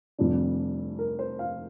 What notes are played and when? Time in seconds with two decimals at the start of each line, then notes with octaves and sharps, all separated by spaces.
0.18 F1 F2 C3 G3 D4
0.99 A#4
1.19 C5
1.39 F5